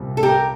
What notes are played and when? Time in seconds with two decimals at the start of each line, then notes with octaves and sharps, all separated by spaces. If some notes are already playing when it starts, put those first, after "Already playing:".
Already playing: C2 A#2 G3 C4
0.17 A4
0.23 G4 A#4